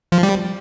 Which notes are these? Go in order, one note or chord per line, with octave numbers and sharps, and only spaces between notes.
F3
G3